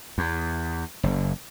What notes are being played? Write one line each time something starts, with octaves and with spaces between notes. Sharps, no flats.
E2
F#1